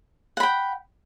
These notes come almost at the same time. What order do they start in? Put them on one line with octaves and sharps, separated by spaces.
F#5 B5 G5